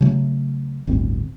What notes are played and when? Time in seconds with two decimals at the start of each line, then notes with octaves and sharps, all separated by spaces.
0.01 C#3 F#3 A3
0.87 G1 D2 A2 C4